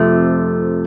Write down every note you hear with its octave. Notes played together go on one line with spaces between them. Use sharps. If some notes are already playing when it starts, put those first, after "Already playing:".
Already playing: F2 C3 F3 A3